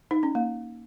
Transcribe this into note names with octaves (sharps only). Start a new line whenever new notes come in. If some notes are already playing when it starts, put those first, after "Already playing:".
D#4
C#4
A#3